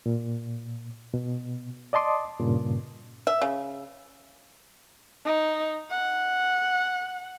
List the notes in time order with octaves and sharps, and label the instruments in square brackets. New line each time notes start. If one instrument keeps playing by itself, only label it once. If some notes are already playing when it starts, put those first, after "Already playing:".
[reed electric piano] A#2
B2
D5 D#5 A5 C6 D6 D#6
G2 A#2 C#3
[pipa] E5
C#3
[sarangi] D#4
F#5